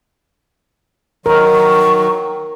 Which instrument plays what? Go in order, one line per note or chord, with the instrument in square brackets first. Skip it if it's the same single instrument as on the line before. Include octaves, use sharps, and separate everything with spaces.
[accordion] D#3 F#3 [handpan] A#4 [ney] C#6